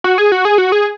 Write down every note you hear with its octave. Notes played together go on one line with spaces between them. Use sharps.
F#4
G#4
F#4
G#4
F#4
G#4